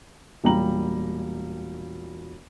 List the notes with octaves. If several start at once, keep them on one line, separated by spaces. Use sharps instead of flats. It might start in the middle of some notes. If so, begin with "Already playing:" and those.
E1 A#2 G3 A#5 F#7